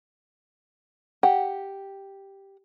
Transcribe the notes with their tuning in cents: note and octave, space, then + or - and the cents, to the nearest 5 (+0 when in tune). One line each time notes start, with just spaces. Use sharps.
G4 +0 F#5 +0